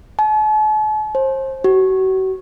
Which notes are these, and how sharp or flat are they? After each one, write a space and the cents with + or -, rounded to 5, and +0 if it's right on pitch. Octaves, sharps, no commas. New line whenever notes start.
A5 -45
C5 +35
F#4 +40